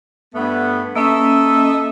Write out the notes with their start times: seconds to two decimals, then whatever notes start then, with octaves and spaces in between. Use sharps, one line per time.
0.35 G2 A3 B3
0.96 A#3 C#4 A4 D#5 E5